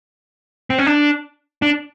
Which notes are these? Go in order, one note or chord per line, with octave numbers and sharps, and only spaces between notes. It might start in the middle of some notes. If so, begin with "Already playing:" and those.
C4
C#4
D4
D4